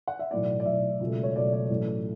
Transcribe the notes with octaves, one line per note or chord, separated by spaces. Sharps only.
F#5
E5
B1 A2 E3 D5
D5
B1 A2 E3 E5
C#2 B2 F#3 A3
C#5
C#2 B2 F#3 A3 D5
D5
A1 A2 F#3 A3